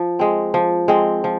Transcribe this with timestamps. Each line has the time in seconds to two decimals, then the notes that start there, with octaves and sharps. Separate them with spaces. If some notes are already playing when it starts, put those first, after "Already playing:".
Already playing: F3
0.19 G#3 C4
0.54 F3
0.88 G#3 C4
1.24 F3